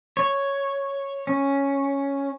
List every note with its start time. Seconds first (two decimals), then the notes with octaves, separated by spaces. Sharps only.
0.17 C#5
1.27 C#4